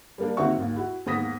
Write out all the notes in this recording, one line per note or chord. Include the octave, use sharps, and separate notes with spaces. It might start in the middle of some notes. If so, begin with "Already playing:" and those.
G3 A#3 D4
D#2 D#3 C4 F#4 E5 C#6
G#1 D#2
E4 F#4
D#2 G#2 B3 D#6 A#6 B6